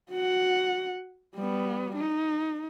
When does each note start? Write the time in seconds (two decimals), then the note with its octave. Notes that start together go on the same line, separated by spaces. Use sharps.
0.11 F#4 F#5
1.35 G3 B3
1.96 D#4